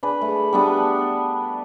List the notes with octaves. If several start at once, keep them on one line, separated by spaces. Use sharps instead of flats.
D4 G#4 B4
A3
G3 B3 D4